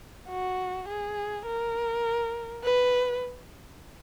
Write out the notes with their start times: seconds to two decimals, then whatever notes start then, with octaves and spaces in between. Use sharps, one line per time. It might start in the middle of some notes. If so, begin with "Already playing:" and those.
0.30 F#4
0.88 G#4
1.46 A#4
2.63 B4